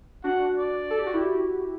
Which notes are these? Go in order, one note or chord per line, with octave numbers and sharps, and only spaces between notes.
D4 F#4 F#5
D5
A4
G4
F#4
E4 G4